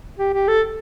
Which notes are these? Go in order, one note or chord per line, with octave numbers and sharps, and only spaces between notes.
G4
G4
A4